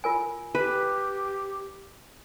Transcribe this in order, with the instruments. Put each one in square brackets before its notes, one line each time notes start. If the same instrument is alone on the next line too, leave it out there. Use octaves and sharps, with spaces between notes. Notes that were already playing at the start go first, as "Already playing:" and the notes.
[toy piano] F4 A#4 G#5
[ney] G4 [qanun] B4